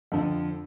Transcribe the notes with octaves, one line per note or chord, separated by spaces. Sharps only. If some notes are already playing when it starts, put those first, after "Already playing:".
F2 D3 F3